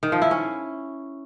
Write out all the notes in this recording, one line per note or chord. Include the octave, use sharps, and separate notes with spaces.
D#3
F3
E4
C#4